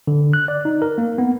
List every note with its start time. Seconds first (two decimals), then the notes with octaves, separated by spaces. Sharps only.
0.07 D3
0.33 F#6
0.48 D5
0.65 D#4
0.82 A#4
0.98 A#3
1.18 B3